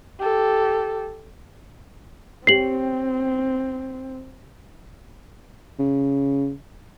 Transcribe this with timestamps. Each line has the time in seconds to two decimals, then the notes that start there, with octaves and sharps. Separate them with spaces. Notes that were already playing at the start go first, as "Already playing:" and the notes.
0.19 G4 A4
2.47 C4 G4 C#5 C7 F#7
5.79 C#3